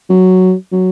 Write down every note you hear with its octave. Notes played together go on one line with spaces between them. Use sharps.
F#3
F#3